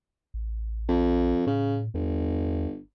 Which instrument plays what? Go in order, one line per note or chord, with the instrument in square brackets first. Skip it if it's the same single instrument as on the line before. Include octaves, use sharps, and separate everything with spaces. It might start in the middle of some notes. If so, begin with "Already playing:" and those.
[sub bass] A1
[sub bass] A#1 [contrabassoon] F2
[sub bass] A2 [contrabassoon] C#3
[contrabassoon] G1 [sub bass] E2